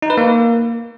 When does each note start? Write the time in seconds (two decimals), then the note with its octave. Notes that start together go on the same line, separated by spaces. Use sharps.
0.02 D#4
0.10 B4
0.17 A#3